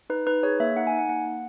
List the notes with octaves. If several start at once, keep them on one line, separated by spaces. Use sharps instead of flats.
D#4 B4
D#4 B4
G#4 C#5
A#3 E5
D#4 F#5
G#5
D#4
F#5
A#3 F#5
A#3